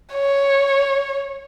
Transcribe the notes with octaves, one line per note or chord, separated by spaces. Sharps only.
C#5